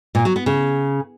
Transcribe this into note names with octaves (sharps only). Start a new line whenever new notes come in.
A#2
F#3
B3
C#3